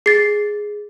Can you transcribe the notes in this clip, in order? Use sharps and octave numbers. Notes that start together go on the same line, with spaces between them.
G#4 A6 C7